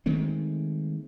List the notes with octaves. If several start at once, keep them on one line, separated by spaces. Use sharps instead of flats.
D#3 G#3 A3 C4